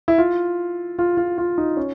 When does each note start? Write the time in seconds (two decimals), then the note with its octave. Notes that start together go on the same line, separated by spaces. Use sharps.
0.08 E4
0.18 F4
0.99 F4
1.17 F4
1.38 F4
1.58 D#4
1.77 C#4